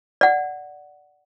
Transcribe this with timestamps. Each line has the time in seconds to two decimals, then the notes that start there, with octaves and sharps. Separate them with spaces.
0.21 D5 F#5